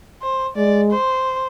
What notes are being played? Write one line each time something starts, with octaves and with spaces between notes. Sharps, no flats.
C5
G#3 D5
C5